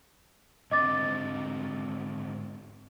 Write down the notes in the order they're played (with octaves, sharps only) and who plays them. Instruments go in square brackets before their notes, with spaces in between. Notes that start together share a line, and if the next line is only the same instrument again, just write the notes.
[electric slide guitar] G#2 D3 C4 [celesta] D#5 D6 A6